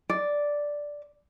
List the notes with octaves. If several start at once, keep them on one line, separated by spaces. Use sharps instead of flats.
D5